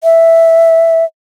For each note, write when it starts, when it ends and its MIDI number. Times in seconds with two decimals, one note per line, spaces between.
0.03 1.04 76